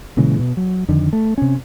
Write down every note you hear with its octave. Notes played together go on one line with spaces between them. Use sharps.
A#2 C#3 E3 G#3
B2
F#3
F2 D3 D#3
A3
C3 C#4